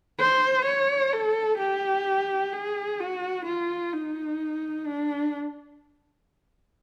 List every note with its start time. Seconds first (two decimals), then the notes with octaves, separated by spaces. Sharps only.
0.19 C5
0.66 C#5
1.13 A4
1.59 G4
2.53 G#4
3.00 F#4
3.46 F4
3.93 D#4
4.86 D4